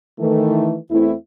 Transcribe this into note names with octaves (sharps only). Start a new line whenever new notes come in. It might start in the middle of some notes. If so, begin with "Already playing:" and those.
D#3 E3 A3
E2 A3 C4 E4